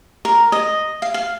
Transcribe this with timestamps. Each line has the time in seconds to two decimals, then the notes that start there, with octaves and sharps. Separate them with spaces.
0.25 A#4
0.52 D#5
1.02 F5
1.14 F5